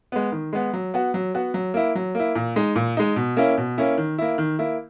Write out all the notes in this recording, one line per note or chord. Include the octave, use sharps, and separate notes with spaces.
G#3 B3
D#3
G#3 B3
F#3
B3 F#4
F#3
B3 F#4
F#3
A#3 E4
F#3
A#3 E4
A#2
G#3 D#4
A#2
G#3 D#4
B2
A#3 C#4 E4
B2
A#3 C#4 E4
D#3
A#3 E4
D#3
A#3 E4